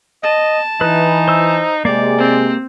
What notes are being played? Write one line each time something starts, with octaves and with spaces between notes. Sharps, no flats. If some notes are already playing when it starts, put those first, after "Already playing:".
D#5 A5
E3 D#4 B4
C5 E6
C3 G#3 A#3 G4 D5
C4